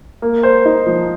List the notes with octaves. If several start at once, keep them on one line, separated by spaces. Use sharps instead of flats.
A#3
C5
D#4
F3